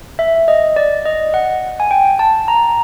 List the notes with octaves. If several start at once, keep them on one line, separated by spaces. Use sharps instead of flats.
E5
D#5
D5
D#5
F#5
G#5
G5
A5
A#5